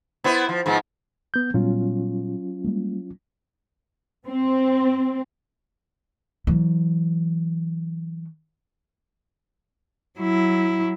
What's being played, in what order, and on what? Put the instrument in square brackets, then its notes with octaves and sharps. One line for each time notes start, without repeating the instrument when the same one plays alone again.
[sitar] B3 E4 C5
F3
G#2 F3 B3
[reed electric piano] B3 G6
[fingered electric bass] A#2 G3 B3 [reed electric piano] F#3 C#4 F4
[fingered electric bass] G3 G#3 A#3
[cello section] C4
[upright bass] E3 F#3
[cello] F#3 E4